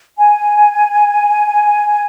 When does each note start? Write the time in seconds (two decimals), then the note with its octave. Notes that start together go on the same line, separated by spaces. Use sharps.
0.18 G#5